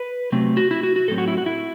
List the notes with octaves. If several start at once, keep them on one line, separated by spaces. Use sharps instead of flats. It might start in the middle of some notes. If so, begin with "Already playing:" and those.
Already playing: B4
C3 F#3 A3 C4
F#4
E4
F#4
F#4
A2 F#3 C4 A4
F#4
E4
F#4
E4